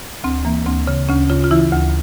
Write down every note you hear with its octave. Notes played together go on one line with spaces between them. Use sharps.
D2 C4
E3 A#3
D2 C4
C#3
D2 C#4
C#3 F4
F4
E3 E4
D2